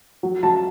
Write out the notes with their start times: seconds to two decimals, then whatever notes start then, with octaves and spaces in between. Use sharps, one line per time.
0.23 F#3
0.43 F#3 A5